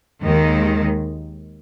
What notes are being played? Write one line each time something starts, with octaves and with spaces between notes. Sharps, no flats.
D#2 D#3 G#3